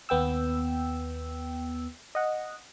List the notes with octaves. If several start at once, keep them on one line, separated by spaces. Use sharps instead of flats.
D#2 B3 G5 E6
D#5 F#5